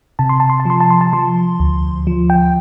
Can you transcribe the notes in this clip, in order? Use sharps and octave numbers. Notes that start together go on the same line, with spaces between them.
C3 A5
C6
A5
C6
A5
F3 C6
A5
C6
A5
F3 C6
D2
F3
G5